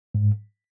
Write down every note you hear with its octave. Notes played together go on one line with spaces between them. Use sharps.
G#2